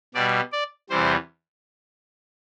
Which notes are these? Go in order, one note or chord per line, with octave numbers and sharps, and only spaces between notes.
B2 G3 D5
D5
E2 C3 E3 G3 C5